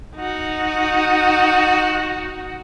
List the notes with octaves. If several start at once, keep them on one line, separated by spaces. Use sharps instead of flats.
D#4 F#4